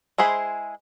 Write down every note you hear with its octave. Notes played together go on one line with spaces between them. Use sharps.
G#3 E4 G#4 C5 B5